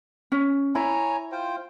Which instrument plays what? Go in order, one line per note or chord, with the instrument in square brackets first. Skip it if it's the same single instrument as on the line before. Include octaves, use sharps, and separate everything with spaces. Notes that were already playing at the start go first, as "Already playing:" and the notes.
[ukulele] C#4
[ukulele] E4 B5 [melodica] C#5 G#5 A#5
[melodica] F4 C5 G5